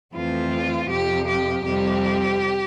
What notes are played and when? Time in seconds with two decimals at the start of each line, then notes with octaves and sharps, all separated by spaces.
0.14 F2 E3 A3 C4 F4
0.89 F2 C3 F3 G4
1.27 G4
1.64 F2 C3 G3 C4 G4